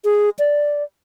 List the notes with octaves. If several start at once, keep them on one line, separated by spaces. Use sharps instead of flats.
G#4
D5